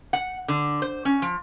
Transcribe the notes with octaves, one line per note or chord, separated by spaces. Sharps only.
F#5
D3
C5
C#4
F3